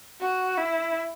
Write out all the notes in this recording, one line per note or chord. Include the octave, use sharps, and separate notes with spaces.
F#4
E4